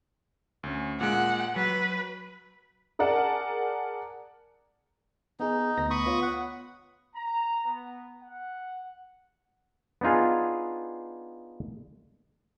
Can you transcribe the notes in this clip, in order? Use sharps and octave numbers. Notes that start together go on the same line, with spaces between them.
D2 C#4
A#2 G#3 F#5
F#3 B4
G#4 A#4 D5 F#5 A5
B3 D#4 G#4
D2 B3 A#6
B5 C#6 D#6
B3 F4 C#5
F#5
A#5
B3
F#5
B3 D4 D#4 F4 G#4